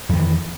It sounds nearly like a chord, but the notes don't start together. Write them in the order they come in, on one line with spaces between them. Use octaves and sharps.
F2 D#3 E3